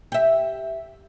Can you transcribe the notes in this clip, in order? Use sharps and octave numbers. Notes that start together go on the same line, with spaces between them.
G4 E5